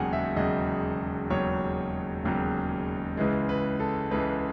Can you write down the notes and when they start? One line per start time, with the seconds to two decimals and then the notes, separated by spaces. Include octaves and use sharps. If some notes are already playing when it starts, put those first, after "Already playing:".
Already playing: E1 D#2 C#3 F#3 F#5 G#5
0.13 E5
0.36 E1 D#2 C#3 F#3 D#5
1.30 E1 D#2 C#3 F#3 C#5
2.24 E1 D#2 C#3 F#3
3.17 C#2 C#3 E3 G#3
3.49 B4
3.80 A4
4.11 C#2 C#3 E3 G#3 B4